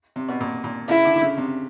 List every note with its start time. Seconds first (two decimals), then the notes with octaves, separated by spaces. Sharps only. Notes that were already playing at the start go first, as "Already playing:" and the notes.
0.16 C3
0.28 B2
0.41 A#2
0.64 A#2
0.89 C#3 E4
1.05 D3
1.16 D3
1.22 C#3
1.37 C3